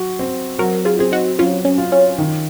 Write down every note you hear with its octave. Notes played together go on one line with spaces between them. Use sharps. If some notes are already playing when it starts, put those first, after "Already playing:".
Already playing: F#3 F#4
C4
F#3 F#4 A#4
F4 G#4
C4 G#4
D#4 F#4
F#3 C#4 F4
C#4
F4
C#4
D#3